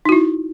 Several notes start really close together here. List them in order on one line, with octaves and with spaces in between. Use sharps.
D#4 F#4 E4